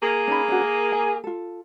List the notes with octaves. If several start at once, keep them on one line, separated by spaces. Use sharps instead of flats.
A#3 G#4
C#4 D#4 B5
C#4 D4 F#4
A#4
G#5
F4 A4